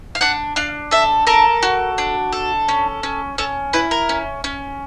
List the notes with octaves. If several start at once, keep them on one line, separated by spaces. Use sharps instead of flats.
F5
D4 F#5
D4 F5
A4 E5
A4 A#4
F#4
D4
A4
C#4
C#4
C#4 A4
E4 B4
A#4
C#4
C#4